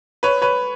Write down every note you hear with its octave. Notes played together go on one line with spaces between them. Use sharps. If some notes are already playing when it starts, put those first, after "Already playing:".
B4 C#5
B4 C#5